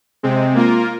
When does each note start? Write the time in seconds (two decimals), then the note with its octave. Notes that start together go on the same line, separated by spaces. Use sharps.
0.23 C3 G#3 C4
0.55 A#3 F4 A#4